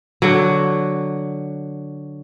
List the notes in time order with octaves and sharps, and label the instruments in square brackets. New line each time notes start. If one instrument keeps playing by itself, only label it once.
[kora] D3 F#3